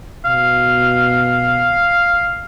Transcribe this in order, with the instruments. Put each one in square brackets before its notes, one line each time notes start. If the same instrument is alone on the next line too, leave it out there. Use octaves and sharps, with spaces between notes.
[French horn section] B2 [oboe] F5